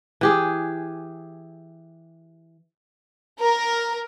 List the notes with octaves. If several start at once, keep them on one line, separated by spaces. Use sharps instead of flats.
E3 G4 G#4
A#4